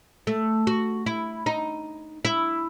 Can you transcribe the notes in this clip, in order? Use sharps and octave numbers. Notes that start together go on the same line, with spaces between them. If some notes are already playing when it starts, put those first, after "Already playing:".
A3
F#4
E4
D#4
E4